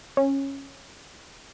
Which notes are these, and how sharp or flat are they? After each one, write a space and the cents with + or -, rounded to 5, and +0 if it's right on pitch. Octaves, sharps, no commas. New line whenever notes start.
C#4 -15